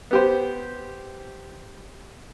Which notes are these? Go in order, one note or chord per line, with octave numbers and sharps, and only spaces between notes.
B3 G4 C5